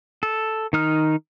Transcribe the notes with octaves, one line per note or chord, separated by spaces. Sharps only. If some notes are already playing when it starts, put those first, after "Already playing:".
A4
D#3 D#4 F6